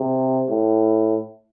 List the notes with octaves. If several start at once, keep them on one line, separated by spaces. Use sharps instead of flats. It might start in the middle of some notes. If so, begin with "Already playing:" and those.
Already playing: C3
A2